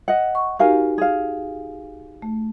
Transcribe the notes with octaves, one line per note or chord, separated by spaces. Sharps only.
D#5 F#5
C#6
D#4 F#4 G4 A#4 F5 G#5
G#4 F5
A3